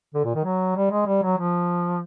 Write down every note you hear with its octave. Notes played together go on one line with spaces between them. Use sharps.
D3
A#2
D#3
F#3
G3
G#3
G3
F#3
F3